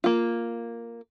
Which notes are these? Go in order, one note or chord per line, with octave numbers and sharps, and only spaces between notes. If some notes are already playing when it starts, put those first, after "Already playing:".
A#3 F4